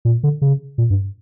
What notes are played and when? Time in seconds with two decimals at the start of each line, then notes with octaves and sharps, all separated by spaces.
0.05 A#2
0.23 D3
0.42 C#3
0.78 A#2
0.90 G2